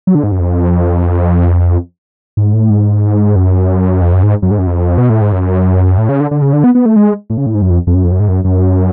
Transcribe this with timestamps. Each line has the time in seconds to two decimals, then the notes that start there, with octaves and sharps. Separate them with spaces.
0.07 F#3
0.15 D3
0.23 G#2
0.32 F#2
0.39 F2
2.37 G#2
2.53 A2
2.70 G#2
3.36 F#2
4.01 F2
4.12 F#2
4.23 G#2
4.42 F#2
4.51 G#2
4.59 F#2
4.67 F2
4.98 B2
5.10 A2
5.21 G#2
5.33 F#2
5.98 A2
6.09 C#3
6.20 D3
6.31 D3
6.42 C#3
6.53 D3
6.64 B3
6.75 B3
6.86 A3
6.96 G#3
7.30 A2
7.38 C#3
7.46 A2
7.55 G#2
7.62 F#2
7.70 F2
7.87 F2
7.95 F#2
8.04 F2
8.12 F#2
8.20 G#2
8.28 F#2
8.44 F#2